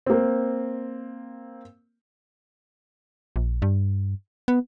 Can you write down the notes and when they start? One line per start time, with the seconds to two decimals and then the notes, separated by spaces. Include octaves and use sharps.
0.06 A#3 C4
3.36 A#1
3.62 G2
4.48 B3